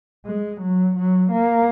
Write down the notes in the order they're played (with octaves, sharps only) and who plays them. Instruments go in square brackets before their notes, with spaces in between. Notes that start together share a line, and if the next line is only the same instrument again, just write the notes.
[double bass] G#3
F#3
F#3
A#3